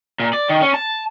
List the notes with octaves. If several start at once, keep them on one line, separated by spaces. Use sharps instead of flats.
A#2
D5
D#3
C#4
A5